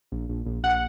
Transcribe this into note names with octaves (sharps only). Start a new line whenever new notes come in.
A#1
A#1
A#1
A#1 F#5